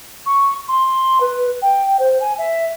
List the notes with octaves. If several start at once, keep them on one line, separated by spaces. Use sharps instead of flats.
C#6
C6
B4
G5
C5
G#5
E5